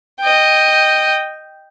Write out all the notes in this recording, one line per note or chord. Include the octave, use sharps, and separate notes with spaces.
D#5 G5